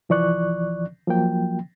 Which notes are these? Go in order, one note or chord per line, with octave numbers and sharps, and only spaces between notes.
C2 E3 F3 D5 C#6 F#6
F3 F#3 A#3 G5